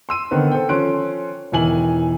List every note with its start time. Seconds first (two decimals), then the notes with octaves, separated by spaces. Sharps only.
0.09 C6 E6 D#7
0.31 D3 D#3 B3 C4 B4
0.51 A4 C5 G5
0.69 F3 C#4 A4 C6 F#6 D7
1.52 E1 D#3 E3 G#5 F#7